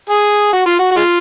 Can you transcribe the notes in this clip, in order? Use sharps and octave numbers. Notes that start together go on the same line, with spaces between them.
G#4
F#4
F4
F#4
F#4
G#3 F4